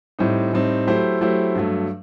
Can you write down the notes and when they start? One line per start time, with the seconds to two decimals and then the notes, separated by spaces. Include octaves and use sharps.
0.19 A2 G3 C4 D#4
0.53 A2 G3 C4 D#4
0.87 F#3 A3 E4 G4 C5
1.21 F#3 A3 E4 G4 C5
1.55 G2 F#3 A3